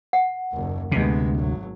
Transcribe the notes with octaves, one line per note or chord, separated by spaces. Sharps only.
F#5
F#1 D#2
D2 C3 G#3 B3
G#1 F#3